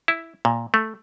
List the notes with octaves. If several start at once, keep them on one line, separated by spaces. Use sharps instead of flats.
E4
A#2
A3